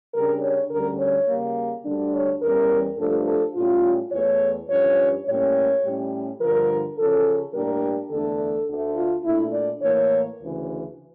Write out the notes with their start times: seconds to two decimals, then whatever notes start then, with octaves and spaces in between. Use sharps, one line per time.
0.14 C#3 G3 D4 A#4
0.42 C#5
0.71 D2 D3 G3 C#4 A#4
0.99 C#5
1.28 C#3 G3 A#3
1.85 D2 D3 G3 D4
2.13 C#5
2.41 E2 E3 G3 C#4 A#4
2.98 G2 F3 A3 D4 A4
3.27 A4
3.55 A2 G3 C#4 F4
4.12 E2 E3 A3 C#5
4.69 G2 F3 C#4 C#5
5.26 A2 G3 A#3 C#4 C#5
5.83 A2 G3 C#4
6.40 G2 D3 F3 A#4
6.97 C#3 F3 C#4 A4
7.54 A2 G3 A#3 D4 A#4
8.11 E2 D3 A3 D4 A4
8.68 D2 D3 A3
8.96 F4
9.24 A#2 A3 D4 E4
9.53 D5
9.81 A2 E3 A#3 C#5
10.39 D2 C#3 E3